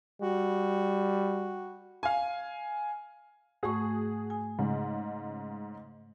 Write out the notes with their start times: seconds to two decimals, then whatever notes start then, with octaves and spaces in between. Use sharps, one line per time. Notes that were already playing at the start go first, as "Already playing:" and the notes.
0.22 G3 F#4
2.03 F5 G#5
3.63 G#2 A3 F#4 G#4 C#6
4.30 G#5
4.59 G#2 C#3 G#3